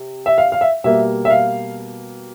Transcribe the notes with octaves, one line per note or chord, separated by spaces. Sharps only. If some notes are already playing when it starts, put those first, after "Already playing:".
Already playing: C3
E5
F5
F5
E5
B2 G3 A#3 E5
E5
F5